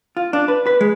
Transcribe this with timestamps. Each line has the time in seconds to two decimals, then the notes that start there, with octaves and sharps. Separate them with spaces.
0.17 F4
0.33 D4
0.48 B4
0.67 B4
0.81 G#3